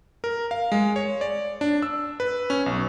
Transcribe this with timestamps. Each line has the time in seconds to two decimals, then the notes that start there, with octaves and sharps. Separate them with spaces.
0.24 A#4
0.51 F5
0.72 G#3
0.96 C#5
1.21 D5
1.61 D4
1.82 E6
2.20 B4
2.50 C#4
2.66 B1